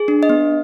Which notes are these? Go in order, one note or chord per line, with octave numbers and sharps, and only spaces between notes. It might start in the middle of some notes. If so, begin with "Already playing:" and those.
Already playing: G#4
D4
D#5
B3